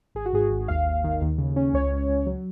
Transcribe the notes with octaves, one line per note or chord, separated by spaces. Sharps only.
G#1 G#4
F#4
G#2 G#4
G#1
D#2 F5
D#2
D#3
D#2
C#3
C#4
C#2 C#5
C#2
C#2
F#3